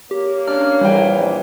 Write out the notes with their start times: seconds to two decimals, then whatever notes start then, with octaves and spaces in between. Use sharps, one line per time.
0.11 A#3 G4 C#5
0.47 C#4 D4 F6
0.81 A#1 E3 G3 G5